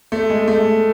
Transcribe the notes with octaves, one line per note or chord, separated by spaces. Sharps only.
A3
G#3
A3